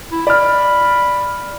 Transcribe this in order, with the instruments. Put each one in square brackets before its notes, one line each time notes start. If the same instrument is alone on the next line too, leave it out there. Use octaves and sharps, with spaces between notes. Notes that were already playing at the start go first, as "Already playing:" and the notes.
[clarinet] E4
[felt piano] D5 F6 [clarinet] B5